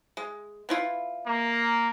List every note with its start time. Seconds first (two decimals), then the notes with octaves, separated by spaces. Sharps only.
0.17 G#3
0.69 B3 E4 F4
1.27 A#3